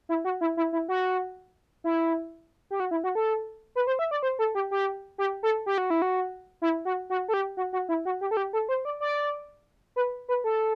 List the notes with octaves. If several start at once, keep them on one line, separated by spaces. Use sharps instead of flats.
E4
F#4
E4
E4
E4
F#4
E4
G4
F#4
E4
F#4
A4
B4
C5
E5
D5
C5
A4
G4
G4
G4
A4
G4
F#4
E4
F#4
E4
F#4
F#4
A4
G4
F#4
F#4
E4
F#4
G4
A4
G4
A4
C5
D5
D5
B4
B4
A4